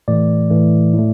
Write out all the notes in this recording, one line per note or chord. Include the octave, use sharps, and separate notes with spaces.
A2 E3 A3 D5
A2 E3 A3
A2 A3